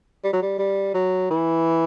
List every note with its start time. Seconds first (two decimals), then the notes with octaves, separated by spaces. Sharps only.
0.24 G3
0.33 F#3
0.42 G3
0.59 G3
0.94 F#3
1.30 E3